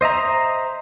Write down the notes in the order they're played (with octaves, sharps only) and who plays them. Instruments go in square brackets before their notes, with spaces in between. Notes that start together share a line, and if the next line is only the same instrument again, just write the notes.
[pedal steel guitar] C5 D#5 E5 A#5